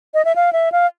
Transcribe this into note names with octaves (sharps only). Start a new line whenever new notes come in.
D#5
E5
F5
E5
F5